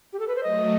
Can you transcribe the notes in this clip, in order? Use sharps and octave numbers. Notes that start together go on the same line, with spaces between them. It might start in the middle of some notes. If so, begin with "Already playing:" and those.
G4
A4
B4
C5
F#3 A3 D#5